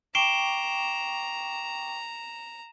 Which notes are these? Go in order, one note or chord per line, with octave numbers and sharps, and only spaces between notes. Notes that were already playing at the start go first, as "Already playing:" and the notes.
G5 A#5 C#6 D6 C7 D7 E7 G7